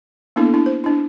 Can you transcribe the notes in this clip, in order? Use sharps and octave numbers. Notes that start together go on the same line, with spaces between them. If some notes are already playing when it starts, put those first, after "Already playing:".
A#3 B3 D4 E4 A4
D4 E4
C5
D4 E4